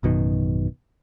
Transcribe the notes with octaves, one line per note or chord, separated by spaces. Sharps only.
A1 F#2 B2 D#3